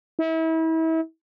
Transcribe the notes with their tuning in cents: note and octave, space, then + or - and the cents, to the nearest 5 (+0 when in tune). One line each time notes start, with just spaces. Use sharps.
E4 -35